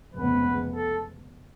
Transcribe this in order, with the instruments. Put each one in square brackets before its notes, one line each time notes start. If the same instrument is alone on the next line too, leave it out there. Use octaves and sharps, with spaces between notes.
[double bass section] F1 F2 C#3 G#3 B3 [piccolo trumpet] B4
[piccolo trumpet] A4